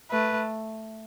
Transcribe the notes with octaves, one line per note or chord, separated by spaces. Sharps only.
A3 B4